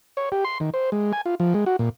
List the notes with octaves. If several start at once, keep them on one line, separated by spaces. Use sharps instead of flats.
C#5
G4
C6
D#3
C5
G#3
G#5
F4
F3
G#3
F#4
A#2